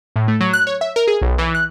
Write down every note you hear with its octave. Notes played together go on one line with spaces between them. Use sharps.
A2
A3
F#3
F#6
C#5
E5
A#4
G#4
B1
E3
F#6